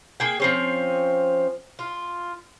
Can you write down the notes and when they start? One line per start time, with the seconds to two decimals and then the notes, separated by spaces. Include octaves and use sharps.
0.20 A#3 G#4 G5
0.40 F3 C4 C#4
1.79 F4